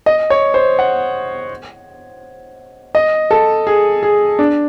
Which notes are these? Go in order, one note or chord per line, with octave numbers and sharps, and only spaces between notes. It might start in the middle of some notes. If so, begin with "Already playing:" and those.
D#5
C#5
C5
F#5
D#5
A4
G#4
G#4
D4